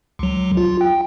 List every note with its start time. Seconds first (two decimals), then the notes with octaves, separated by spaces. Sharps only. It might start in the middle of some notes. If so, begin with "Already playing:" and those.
0.19 C#2 F#3
0.57 F4
0.81 G5